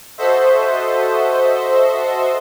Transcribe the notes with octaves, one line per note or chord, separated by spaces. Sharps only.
F#4 A4 C5 D#5 E5